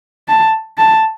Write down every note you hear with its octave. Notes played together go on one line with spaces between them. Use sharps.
A5
A5